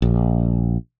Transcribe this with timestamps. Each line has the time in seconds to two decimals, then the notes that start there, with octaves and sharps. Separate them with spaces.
0.02 A#1